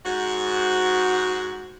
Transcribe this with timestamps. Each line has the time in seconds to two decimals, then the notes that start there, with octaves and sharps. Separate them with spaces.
0.05 G#2 F#4